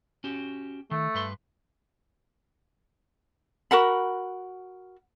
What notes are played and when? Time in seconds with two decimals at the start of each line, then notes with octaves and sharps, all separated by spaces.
0.24 C#4 F#4 G4
0.91 D#3 A3
1.14 G2 B4 C6
3.71 F#4 A#4 F#5 B5